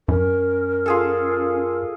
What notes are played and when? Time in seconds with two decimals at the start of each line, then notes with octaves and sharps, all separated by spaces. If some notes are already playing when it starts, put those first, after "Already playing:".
0.08 F#2 C#4 A#4
0.86 F4 G#4 A4